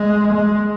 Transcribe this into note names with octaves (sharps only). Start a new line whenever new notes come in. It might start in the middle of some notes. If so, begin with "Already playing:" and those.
Already playing: G#3
G#3